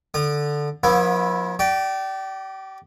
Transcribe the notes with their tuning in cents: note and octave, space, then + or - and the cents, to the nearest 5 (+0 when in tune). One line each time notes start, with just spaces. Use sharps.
D3 +0 D#6 -40
F3 +40 B3 -45 E4 +0
G4 -35 D5 +0